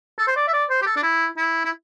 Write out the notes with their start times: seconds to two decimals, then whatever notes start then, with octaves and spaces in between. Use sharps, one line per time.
0.18 A4
0.27 C5
0.36 D5
0.48 E5
0.53 D5
0.70 C5
0.82 G4
0.86 A4
0.96 D4
1.03 E4
1.37 E4
1.65 E4